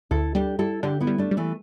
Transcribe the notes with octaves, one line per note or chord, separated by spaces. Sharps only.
D2 E4 A4
G3 D4 G4
G3 E4 A4
D3 D4 G4
B3 E4
G3
A3 D4
G3
E3 A3